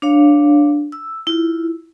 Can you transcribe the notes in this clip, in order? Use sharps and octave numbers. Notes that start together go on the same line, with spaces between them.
D4 C#5 F5
E6
E4 F4